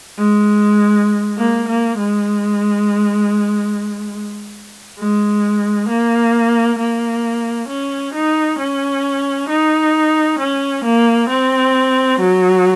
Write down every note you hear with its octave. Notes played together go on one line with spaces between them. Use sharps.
G#3
A#3
A#3
G#3
G#3
A#3
A#3
C#4
D#4
C#4
D#4
C#4
A#3
C4
F#3